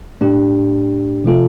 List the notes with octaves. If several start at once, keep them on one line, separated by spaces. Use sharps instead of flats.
A2 A3 D4 G4
C3 F3 A3 F4 A4